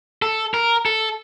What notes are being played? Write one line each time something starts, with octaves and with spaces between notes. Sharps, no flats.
A4
A#4
A4